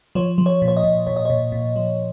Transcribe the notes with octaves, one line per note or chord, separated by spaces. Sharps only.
F3 C#5
F3
C#5
A#2
C#5
D#5
A#2
A#2 C#5
D#5
A#2 C#5
A#2
F3